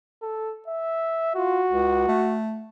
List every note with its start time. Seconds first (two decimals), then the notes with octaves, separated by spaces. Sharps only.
0.22 A4
0.68 E5
1.35 F4 F#4
1.70 C#2
2.08 A3